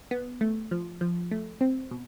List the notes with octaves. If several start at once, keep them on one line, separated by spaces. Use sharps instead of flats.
B3
A3
F3
F3
A3
C4
B2